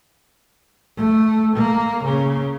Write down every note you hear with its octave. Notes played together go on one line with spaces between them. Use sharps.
A3
A#3
C#3